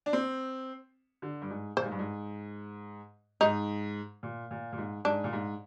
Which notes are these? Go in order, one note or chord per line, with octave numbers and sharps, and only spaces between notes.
D4
C4
D3
G2
G#2
A#2 C5
G#2
G2
G#2
G#2 D#4
A#2
A#2
A#2
G#2
G#2 D4
A#2
G#2